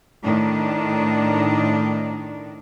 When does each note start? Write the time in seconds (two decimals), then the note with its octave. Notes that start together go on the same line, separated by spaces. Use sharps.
0.22 A2 D#3 D4